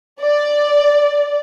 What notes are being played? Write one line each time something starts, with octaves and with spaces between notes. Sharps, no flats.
D5